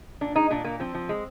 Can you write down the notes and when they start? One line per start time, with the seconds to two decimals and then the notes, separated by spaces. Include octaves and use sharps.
0.21 A#2 D4
0.35 G#3 D#4
0.50 A#2 D4
0.64 A#2 A#3
0.80 F3 C4
0.95 F3
1.09 G#3